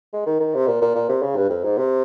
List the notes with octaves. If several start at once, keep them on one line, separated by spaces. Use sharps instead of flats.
G#3
D#3
D#3
C3
A#2
A#2
A#2
C3
C#3
G2
F2
G#2
C3